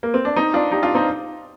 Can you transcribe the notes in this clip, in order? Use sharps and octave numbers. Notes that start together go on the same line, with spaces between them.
A#3
C4
D4
C4 D#4
D4 F4
D#4 G4
D4 F4
C4 D#4